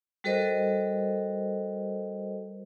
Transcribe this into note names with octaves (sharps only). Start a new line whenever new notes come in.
G3 F#4 A4 A#4 C5 D#5